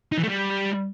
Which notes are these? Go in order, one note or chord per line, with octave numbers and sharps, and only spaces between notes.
D#4
E3
A3
G3